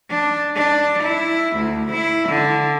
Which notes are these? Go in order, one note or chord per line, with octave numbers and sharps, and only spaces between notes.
D4
D4
E4
D2
E4
D3